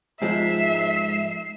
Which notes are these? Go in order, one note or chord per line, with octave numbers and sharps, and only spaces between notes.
G#2 F3 G#3 E5 C7 E7